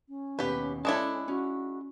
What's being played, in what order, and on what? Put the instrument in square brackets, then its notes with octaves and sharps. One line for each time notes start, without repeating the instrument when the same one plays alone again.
[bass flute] C#4
[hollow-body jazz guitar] D#2 B2 [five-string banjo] G4 B4
[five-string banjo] G#3 D4 E4 [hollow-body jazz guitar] A4 C#5 A5
[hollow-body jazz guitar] C#4 [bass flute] F#4